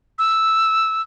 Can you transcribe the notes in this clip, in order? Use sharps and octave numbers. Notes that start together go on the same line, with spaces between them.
E6